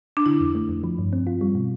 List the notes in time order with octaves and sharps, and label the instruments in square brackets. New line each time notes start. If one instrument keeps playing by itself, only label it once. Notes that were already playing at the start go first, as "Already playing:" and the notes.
[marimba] D4
[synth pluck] D3 [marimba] E4
[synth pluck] F2
A3
F2
F3
G2
C4
F4
G3
B2